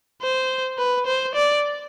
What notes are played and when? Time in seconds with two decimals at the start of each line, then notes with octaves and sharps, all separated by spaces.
0.22 C5
0.79 B4
1.07 C5
1.35 D5